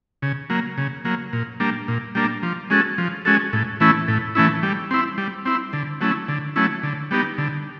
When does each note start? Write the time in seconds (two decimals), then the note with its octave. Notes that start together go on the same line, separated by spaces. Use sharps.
0.22 C#3
0.50 F#3 A#3
0.78 C#3
1.05 F#3 A#3
1.33 A#2
1.60 G3 A#3 D4
1.88 A#2
2.15 G3 A#3 D4
2.43 F3
2.70 G#3 C#4 F#4 A4
2.98 F3
3.25 G#3 C#4 F#4 A4
3.53 A2
3.80 E3 A3 C#4 E4
4.08 A2
4.35 E3 A3 C#4 E4
4.63 G3
4.91 C4 E4
5.18 G3
5.45 C4 E4
5.73 D3
6.01 F#3 A3 C#4 E4
6.28 D3
6.56 F#3 A3 C#4 E4
6.83 D3
7.11 G3 B3 D#4 G4
7.38 D3